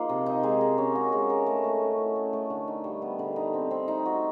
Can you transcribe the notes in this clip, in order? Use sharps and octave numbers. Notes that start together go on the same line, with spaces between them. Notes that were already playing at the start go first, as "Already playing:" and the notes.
Already playing: F3 A#3 D#4
C3
D#4
G#3
A#4
C#4
F#4
G#3
A#4
A3
A3
C#4
E4
A3
A3
D3
D#4
G3
B3
D3
D#4
C4
C4
D#4
F#4